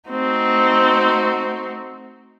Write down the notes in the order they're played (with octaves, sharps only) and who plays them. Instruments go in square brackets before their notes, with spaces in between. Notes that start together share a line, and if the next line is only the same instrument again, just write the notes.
[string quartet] A3 C4 D#4 F#4